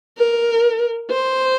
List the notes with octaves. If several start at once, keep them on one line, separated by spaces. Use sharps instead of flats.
A#4
C5